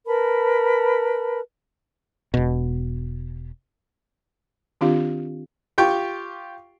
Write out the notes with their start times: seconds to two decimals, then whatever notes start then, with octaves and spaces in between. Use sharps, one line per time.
0.06 A#4 B4 A5 B5
2.34 E1 B2
4.81 D#3 C4 D4 F4 G4 F5
5.78 F4 G4 G5 C#6